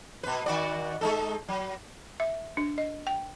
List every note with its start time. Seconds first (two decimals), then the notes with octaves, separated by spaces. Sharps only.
0.23 B2 B4
0.46 D#3 F#4 D5
1.01 G#3 D#4 A4
1.48 F#3
2.20 E5
2.57 D4
2.78 D#5
3.07 G5